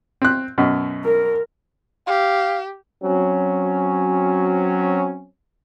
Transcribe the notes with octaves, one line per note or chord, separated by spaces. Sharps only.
C4 F#6
F#2 B2
A#4
G4 F5
F#3 C4 C#4